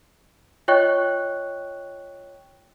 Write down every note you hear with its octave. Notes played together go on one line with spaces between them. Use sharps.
F4 C#5 D#5 G5 C#6 F#6